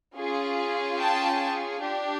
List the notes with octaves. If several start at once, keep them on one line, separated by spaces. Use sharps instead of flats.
C#4 F4 G#4
G5 A5
D4 G4